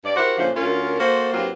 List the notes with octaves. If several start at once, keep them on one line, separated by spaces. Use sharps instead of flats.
G2 D5
E4 F#4 G4 A#4 C5 F#5
A#2 C#3 F3 A3 D4 C5
D2 C#4 F4 A#4
A#3 F#4 A4 C5
G2 F#3 A#3 C4 F4